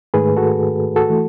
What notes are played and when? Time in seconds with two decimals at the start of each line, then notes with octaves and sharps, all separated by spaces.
0.14 G#2 D#3 A3 G#4 B4
0.37 F#4 A4
0.96 F#4 A4
1.10 E3 A3